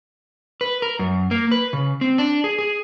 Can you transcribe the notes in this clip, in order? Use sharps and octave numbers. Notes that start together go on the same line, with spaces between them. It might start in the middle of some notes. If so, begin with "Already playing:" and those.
B4
A#4
F#2
A#3
B4
C#3
C4
D4
G#4
G#4